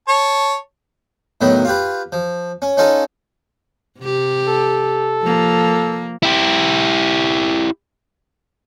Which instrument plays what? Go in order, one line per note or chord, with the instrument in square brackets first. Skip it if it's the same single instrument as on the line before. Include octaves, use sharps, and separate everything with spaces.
[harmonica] C#5 A5
[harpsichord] A2 D#3 F#3 B3
F4 G4 B4
F3
C#4
C#4 D#4 F4 A4
[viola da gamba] C3 G4
[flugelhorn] A4
[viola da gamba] F3 A#3
[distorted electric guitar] E4 G4